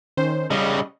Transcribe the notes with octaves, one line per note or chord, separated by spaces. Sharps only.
D#3 C#4 C5
C#3 G3 D#5